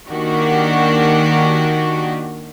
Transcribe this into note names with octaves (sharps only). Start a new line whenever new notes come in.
D#3 A#3 D4 F#4 G4